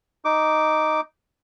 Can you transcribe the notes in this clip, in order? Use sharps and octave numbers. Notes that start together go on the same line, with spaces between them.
D#4 D6